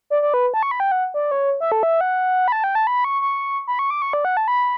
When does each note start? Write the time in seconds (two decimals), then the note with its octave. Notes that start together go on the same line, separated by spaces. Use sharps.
0.10 D5
0.22 D5
0.34 B4
0.54 A5
0.63 C#6
0.71 B5
0.80 G5
0.92 F#5
1.14 D5
1.31 C#5
1.60 E5
1.72 A4
1.83 E5
2.01 F#5
2.48 B5
2.52 A5
2.64 G5
2.75 A5
2.87 B5
3.04 C#6
3.21 C#6
3.68 B5
3.79 C#6
3.90 D6
4.02 C#6
4.13 D5
4.25 F#5
4.37 A5
4.48 B5